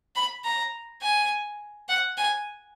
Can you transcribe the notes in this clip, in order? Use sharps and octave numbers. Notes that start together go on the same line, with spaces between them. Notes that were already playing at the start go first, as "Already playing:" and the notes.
B5
A#5
G#5
F#5
G#5